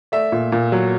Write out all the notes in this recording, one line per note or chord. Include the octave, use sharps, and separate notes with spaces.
A3 D5 E5
A#2
A#2
F#3